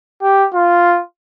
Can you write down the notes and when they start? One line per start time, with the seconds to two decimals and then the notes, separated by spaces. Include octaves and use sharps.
0.22 G4
0.54 F4